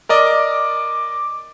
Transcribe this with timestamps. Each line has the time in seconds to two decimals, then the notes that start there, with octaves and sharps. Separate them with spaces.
0.09 A#4 D5 D#5 D6